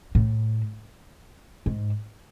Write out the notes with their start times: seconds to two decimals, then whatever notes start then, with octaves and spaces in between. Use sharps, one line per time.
0.15 A2
1.66 G#2